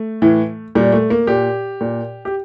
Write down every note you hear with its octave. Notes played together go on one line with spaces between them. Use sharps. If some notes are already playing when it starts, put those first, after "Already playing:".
Already playing: A3
A2 E3
A#2 G3
A3
A#3
A#2 G4
A#2
G4